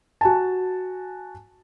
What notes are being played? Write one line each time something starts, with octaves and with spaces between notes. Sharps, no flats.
F#4 G#5 A5